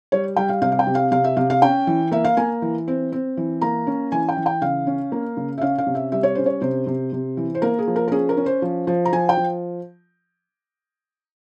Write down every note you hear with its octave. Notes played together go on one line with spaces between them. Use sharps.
G3 C#5
G3 G5
F5
C3 F5
F5
G5
C3
F5
C3 F5
E5
C3 F5
F5
C#4 G5
E3
A#3 E5
F5
A#3 G#5
E3
C4
C4
E3
A#3 A#5
C#4
E3 G#5
G5
E3
G5
C#3 F5
C#4
A#3
C#3
E5
C#4 F5
F5
C3
E5
G3 E5
C#5
C#4 C5
C#5
C3 C5
C3
C3
E3
C5
A#3 A#4
G#4
F3
A#4
A#4
C#4 G#4
A#4
C#4
C5
F3
F3
A#5
F3 G#5
G5
F3